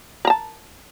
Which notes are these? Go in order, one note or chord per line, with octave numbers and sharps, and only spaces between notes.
A#4 A5 A#5